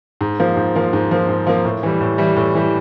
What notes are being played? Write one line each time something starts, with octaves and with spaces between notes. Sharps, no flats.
G#2
F3 A#3
G#2
F3 A#3
G#2
F3 A#3
G#2
F3 A#3
A2
E3 G3
A2
E3 G3
A2
E3 G3